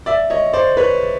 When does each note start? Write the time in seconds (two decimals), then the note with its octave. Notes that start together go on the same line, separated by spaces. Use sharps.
0.06 D5 E5
0.30 C#5 D#5
0.53 C5 D5
0.77 B4 C#5